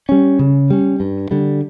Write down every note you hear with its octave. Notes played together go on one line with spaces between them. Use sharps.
G3 C#4
C#3
G3 C#4
G2
D3 G3